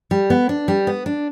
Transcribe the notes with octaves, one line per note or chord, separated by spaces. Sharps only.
G3
B3
D4
G3
B3
D4